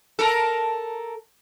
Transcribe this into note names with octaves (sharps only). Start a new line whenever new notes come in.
A4 A#4